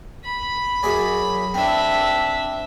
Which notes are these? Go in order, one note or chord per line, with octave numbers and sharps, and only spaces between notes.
B5
F#2 G#4 D5
C4 D4 E4 E5